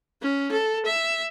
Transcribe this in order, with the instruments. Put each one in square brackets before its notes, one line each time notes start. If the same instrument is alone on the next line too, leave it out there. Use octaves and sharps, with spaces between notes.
[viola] C#4
A4
E5